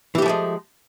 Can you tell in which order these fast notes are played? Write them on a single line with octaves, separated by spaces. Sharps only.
E3 G4 A3 F3 G#3